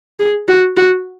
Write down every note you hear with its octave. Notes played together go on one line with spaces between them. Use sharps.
G#4
F#4
F#4